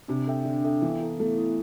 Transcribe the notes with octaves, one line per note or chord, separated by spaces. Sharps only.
C3 D4
A4 E5 G5
D3 D4
A4 E5 G5
E3 B3
E4 A4
A3 B3
E4 A4